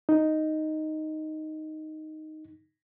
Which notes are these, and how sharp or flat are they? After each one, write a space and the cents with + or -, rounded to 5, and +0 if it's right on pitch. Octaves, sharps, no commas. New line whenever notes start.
D#4 +0